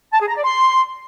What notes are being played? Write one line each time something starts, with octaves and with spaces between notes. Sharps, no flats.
A5
G#4
A#5
D5
C6